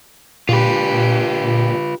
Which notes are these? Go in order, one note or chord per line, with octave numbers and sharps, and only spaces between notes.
A#2 D4 F4 G4 B4